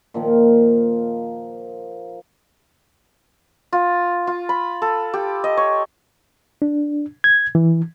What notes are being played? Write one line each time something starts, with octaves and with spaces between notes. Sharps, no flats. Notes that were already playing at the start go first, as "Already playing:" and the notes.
A#2 D#3 F3 A#3
F4
F4
B5
A4
G4
D#5
C#5
D4
G#6
E3